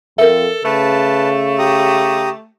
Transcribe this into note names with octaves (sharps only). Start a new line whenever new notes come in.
F2 A4 A#4 E5
C#3 A3 B4 A5
G4 A#5 D#6